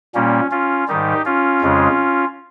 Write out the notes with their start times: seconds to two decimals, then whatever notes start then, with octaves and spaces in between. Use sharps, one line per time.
0.15 A#2 G3 A#3 C#4
0.51 C#4 F4
0.88 G#2 D#3 G3 D#4 G4
1.26 C#4 F4
1.62 F2 C#3 G#3